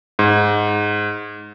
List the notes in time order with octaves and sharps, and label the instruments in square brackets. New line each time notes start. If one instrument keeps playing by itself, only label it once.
[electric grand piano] G#2